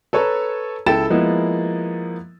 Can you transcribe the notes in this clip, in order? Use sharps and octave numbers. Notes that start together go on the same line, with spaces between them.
A4 B4 C#5 A5 A#5
C#2 E4 A4 G5 A6 E7
F3 G#3 A#3 B3 E4